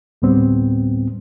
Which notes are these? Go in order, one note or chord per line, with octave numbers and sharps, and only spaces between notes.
D2 A2 G3 B3 C4